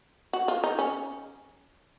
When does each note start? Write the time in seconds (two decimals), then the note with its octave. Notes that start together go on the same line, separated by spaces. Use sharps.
0.33 F#4
0.48 F4
0.64 D#4
0.79 C#4